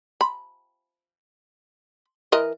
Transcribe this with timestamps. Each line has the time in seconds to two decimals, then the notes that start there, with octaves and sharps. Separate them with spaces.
0.21 B5
2.32 E3 A#4 D#5